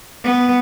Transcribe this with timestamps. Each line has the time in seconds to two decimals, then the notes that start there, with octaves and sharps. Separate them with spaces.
0.24 B3